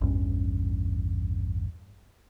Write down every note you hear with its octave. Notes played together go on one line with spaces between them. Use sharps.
A1 E2 G2 C#4